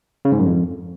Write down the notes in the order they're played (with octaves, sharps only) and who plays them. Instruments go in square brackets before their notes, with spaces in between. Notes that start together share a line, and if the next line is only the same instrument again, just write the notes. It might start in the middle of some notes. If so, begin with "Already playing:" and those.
[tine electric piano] C#3
G#2
F#2
F2